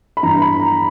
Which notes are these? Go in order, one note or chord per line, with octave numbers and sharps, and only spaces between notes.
B5
G2 E3 A#5
B5
A#5